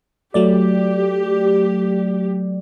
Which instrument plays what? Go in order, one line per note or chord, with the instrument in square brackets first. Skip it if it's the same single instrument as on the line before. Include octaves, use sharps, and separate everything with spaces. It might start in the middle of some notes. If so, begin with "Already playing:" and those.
[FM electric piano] F#3 A3 D5 [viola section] G4